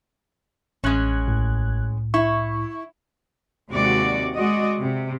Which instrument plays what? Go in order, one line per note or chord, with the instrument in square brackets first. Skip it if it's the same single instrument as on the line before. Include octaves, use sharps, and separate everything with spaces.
[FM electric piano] A1 F#6 G#6 [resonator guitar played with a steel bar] G#3 C#4
[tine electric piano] C2 A2
[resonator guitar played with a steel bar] E4 [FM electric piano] C#6
[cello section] D#2 C3 G#3 F#4 D5
G#3 F#4 D5 D#5
C3